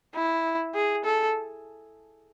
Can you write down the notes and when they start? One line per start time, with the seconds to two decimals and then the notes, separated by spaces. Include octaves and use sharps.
0.15 E4
0.75 G#4
1.05 A4